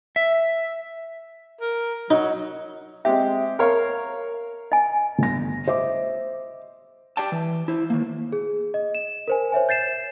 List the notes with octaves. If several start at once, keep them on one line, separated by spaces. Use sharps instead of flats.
E5
A#4
F#3 D#4
G#3 C4 G4 E5
A#4 C#5 F5
D#5 G#5
G1 A#6
C5 D#5 E5 D6
G4 D5 G5 A5
E3
E4 C5
D#3 A#3
G#4
D#5
E7
A#4 C5 G#5
C5 C#5 E5 G#5
G6 A6 C7 E7